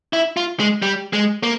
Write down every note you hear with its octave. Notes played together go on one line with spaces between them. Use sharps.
E4
F4
G#3
G3
G#3
A#3